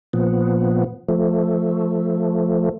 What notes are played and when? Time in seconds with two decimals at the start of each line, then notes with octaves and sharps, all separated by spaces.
0.13 A#2 F3 B3
1.09 F3 A3